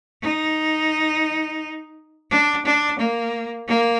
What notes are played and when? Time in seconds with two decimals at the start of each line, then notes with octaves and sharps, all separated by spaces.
0.22 D#4
2.31 D4
2.65 D4
2.99 A#3
3.68 A#3